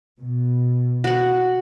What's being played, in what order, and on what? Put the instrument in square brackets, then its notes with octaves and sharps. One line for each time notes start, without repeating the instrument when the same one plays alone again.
[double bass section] B2
[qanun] F#4 F#5